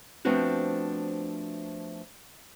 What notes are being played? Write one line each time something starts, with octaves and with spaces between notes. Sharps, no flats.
F3 A3 B3 C4 D4 F#4